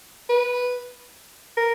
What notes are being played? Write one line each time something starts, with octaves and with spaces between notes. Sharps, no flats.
B4
A#4